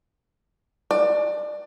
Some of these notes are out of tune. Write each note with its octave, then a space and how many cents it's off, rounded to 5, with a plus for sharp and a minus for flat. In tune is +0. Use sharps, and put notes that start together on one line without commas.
D5 +25